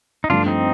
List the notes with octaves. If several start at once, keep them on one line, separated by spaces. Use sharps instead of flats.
D#4
G2 F3 A3 D4 F4
C4 D#4